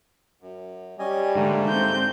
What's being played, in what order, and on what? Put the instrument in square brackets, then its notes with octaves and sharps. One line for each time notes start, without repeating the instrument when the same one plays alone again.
[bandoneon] F#2
[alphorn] G3 [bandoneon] C#4 D#5 G#5
[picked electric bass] G#2 [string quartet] D3 [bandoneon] A3 A#3
[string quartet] C4 G6